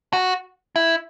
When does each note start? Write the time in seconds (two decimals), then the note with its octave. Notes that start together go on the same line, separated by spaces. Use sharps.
0.13 F#4
0.76 E4